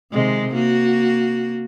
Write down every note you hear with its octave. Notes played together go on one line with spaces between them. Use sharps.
C3 D#3 G#3
A#3 F#4